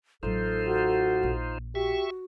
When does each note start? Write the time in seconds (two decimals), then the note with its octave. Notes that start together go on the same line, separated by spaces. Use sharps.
0.23 A1 F#3 D#4 F4 A4 C5
0.67 F#4
1.23 A#1
1.75 F#4 G4 E5 C#6